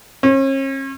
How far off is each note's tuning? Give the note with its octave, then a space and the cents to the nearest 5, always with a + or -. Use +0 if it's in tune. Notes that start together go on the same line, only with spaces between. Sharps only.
C#4 -40